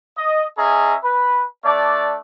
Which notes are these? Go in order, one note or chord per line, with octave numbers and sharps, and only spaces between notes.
D#5
C#4 G#4 D#5 E5 A#5
B4
A3 D4 D5